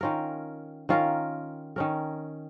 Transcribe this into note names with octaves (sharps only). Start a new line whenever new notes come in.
D#3 C#4 F4 A#4
D#3 C#4 F4 A#4
D#3 C#4 A#4